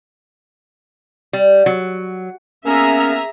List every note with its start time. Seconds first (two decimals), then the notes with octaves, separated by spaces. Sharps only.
1.33 G3
1.66 F#3
2.65 A#3 B3 C#4 G#4 E5 A#5